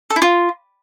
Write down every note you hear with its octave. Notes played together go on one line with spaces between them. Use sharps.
A4
E4
F4